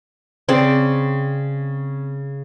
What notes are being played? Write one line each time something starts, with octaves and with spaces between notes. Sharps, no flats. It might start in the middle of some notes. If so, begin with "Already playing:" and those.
C#3 C4 D5